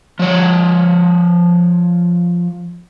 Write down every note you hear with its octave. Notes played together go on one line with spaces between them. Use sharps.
F3 C#5